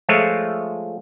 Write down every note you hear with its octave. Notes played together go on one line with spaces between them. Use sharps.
F3 G#3 A3 F4 C#5 E5